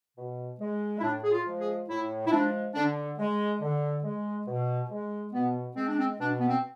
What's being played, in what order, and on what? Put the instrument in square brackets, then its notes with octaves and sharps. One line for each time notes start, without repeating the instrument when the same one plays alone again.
[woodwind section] B2
G#3
E4
A2 D4
G#4
F4
F3 G#3
G#4
A2 E4
E4
F3 G#3 D4
D3 D4
G#3
D3
G#3
B2
G#3
B2 B3
G#3 C4
D4
C4
B2 D4
B3
C4